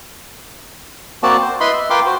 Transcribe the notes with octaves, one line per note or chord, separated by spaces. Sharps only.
A#3 C4 F#4 D5 A5
C5
E4 B4 D#5 B5 C6
E5
F4 A#4 B4 G5 C6 D6
F#4 C5